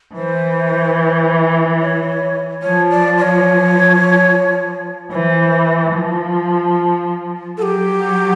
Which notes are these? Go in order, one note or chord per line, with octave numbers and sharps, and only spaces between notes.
E3 C5
C#5
F3 C#5
D5
D5
C#5
E3 C5 C#5
F3
F#3 G4 A4